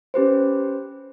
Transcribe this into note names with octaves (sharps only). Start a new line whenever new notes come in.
C#4 G4 B4 C5